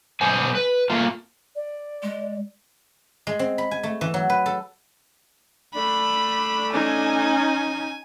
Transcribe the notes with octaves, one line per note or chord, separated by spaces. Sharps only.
B2 B3 D4 C5 G#5
B4
A3 A#3 F4
D5
G#3
G#3
C4
B5
G#5
A3
E3
F#3
B4
A4
A3 D4 B5
C#4 D#4 G#5